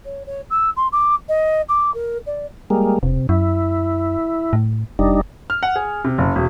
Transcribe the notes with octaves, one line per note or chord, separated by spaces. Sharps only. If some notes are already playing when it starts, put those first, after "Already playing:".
C#5
C#5
E6
C6
D6
D#5
D6
A#4
D5
G3 G#3 A#3
E1 C3
F#2 E4
A2
F1 G3 D4 D#4
F6
F#5
G#4
C3
F#1
E1